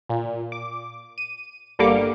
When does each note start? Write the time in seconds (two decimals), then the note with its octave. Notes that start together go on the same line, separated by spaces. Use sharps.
0.10 A#2
0.52 D6
1.18 D#7
1.79 G1 D3 G3 A#3 D6 C#7